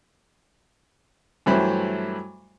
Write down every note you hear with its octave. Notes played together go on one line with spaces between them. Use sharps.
G2 E3 F#3 A3 C5 B5